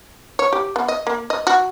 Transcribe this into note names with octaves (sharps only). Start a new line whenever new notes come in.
C#5
G4
B3
D#5
A#3
D#5
F#4